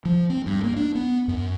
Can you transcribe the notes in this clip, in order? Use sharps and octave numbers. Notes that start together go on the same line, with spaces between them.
F3
C4
G2
A#3
D4
B3
F#2